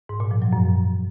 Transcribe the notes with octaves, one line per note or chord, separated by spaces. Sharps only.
G#2
A#2
F3
F#3
F#2